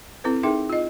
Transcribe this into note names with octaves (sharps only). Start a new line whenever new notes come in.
C4 E4 A4 B4
D#4 G#4 A#4 E5 G5 D6
F4 D#5